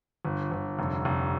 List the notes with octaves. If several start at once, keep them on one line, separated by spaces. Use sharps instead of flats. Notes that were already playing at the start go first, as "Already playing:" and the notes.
G1
G1
F1
F1